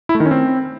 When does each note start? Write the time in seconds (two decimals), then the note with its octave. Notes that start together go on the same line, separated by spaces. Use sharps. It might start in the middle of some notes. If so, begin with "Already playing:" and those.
0.09 E4
0.15 A3
0.20 D#3
0.26 C#4
0.31 C4